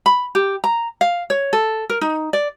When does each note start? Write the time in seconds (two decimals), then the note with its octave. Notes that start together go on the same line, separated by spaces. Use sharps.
0.06 B5
0.35 G4
0.64 A#5
1.01 F5
1.30 C#5
1.53 A4
1.90 A#4
2.01 D#4
2.33 D5